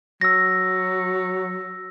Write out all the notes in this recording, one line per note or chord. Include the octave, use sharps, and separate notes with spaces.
F#3 E6 A#6